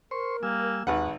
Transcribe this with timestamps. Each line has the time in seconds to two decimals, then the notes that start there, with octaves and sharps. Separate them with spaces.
0.11 A#4 C5 C6 C#6
0.43 G3 A#3 G#5 E6
0.87 G#1 D#2 D#4 B4 F#5